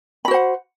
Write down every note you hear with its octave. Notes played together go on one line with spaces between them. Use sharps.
F#4 C5 F#5 B5